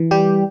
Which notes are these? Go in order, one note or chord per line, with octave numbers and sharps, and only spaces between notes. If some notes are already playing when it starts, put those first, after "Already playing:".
Already playing: E3
G3 G4